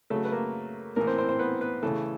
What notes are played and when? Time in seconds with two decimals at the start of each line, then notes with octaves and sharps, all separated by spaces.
0.10 C#3 F#3 A3 A4
0.25 B4
0.32 A#3 A#4
0.96 A2 E3 A#3 A#4
1.07 C4 C5
1.18 C4 C5
1.29 C4 C5
1.39 B3 B4
1.61 B3 B4
1.83 C#3 E3 A3 A4